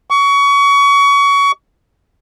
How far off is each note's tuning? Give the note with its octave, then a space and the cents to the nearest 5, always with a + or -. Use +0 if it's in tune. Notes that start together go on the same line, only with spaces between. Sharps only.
C#6 +25